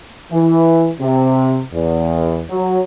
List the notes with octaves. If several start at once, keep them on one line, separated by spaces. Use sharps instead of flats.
E3
C3
E2
F#3